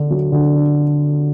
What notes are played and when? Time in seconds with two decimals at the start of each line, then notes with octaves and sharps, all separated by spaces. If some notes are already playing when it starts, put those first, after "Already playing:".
Already playing: D3 D4
0.10 F#3
0.32 D3
0.55 D4